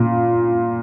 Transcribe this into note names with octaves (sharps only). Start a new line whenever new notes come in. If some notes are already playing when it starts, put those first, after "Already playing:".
Already playing: A#2